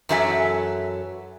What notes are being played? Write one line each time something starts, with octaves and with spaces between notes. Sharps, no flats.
F#2 E3 F#3 A4 E5 G#5